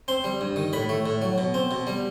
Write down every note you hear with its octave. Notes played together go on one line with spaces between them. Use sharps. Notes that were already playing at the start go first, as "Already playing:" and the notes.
C4 C6
G3
G2
D#3
A2 B5
A3
A2
F#3
B2
C4
B2
G3